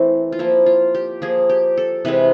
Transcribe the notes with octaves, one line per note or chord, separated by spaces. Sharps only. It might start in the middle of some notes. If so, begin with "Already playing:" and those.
Already playing: E3 A3 C4
F4
F3 A#3 E4
F4
G4
F3 A#3 G#4
G4
A4
C3 E3 G#3 C4 B4